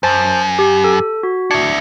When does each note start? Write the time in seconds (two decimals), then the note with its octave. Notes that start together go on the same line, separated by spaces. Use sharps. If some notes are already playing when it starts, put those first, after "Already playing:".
0.03 F#2 C5 A5 A6
0.59 G4
0.84 A4
1.23 F#4
1.51 D4 E4 G#6 C#7